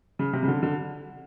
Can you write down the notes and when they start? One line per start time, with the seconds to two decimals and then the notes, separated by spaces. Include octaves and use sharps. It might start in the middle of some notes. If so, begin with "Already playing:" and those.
0.19 C#3
0.33 C3
0.43 C#3
0.48 D3
0.63 D3